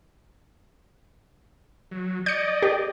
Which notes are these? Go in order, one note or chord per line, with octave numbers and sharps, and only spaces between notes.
F#3
D5 D#5 G6 C#7
G4